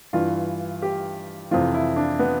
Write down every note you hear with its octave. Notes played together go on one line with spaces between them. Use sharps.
G2 E3 F4
G4
F2 C3 E3 F4
E4
D4
B3